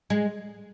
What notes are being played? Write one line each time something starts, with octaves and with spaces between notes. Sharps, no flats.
G#3